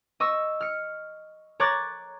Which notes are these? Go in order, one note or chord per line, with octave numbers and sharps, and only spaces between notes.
D#5 C#6 E6
F6 C#7
C#5 A#5 C#6 D6 F#6 A6